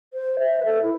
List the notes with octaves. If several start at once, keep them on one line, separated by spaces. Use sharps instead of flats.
C5
E5
B4
A4
E4